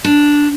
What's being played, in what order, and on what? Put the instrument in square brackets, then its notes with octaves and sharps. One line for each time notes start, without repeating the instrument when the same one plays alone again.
[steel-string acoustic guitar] D4